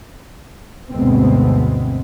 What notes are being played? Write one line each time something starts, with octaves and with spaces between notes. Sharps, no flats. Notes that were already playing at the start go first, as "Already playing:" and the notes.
D2 G2 B2 G#3 B3 C4